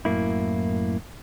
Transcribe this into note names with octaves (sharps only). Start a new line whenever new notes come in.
F#2 A2 A#3 E4